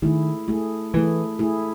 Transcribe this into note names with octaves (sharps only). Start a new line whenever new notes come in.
D#3 A3 E4 G#4
A3 E4 G#4
E3 A3 E4 G#4
A3 E4 G#4